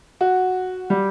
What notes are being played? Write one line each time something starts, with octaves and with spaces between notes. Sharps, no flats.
F#4
G3